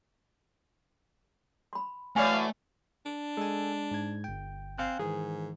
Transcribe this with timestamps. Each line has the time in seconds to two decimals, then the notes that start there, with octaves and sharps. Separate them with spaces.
1.73 B5 C6
2.16 E3 F#3 A3 C#5 D5 F5 G#5
3.06 D4
3.37 G#3 A4 G#5
3.91 G#2 G#6
4.24 G1 G5
4.78 C4 F5 G#5 F#6
4.99 G#2 D#3 E3 G#4